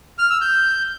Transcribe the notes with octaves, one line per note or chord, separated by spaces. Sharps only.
F6
E6
G6